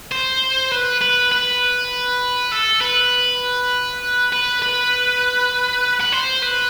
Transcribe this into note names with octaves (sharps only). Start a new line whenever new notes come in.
C5
B4
B4
B4
A4
B4
B4
B4
B4
C5
B4